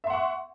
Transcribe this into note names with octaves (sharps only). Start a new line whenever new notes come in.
E5 F#5 C6 C#6